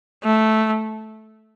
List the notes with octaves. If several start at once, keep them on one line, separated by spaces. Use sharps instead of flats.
A3